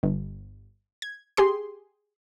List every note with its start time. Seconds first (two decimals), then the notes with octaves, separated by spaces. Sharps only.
0.03 G1
1.02 G#6
1.37 G4 G#4 C6